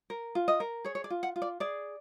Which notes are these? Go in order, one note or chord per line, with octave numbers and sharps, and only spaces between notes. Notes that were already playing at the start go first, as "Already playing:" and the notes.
A#4
F4
D#5
A#4
G#4 C#5
C#5
D5
F4
F#5
F4
D5
G#4 D5